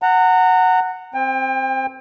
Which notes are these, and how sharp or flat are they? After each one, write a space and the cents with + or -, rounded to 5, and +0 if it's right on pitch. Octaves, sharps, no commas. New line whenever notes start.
F#5 +0 A#5 -30
C4 +0 G5 +35